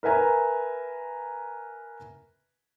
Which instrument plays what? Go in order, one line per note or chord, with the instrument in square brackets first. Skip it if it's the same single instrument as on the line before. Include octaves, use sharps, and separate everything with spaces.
[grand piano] A#4 B4 E5 G#5 A#5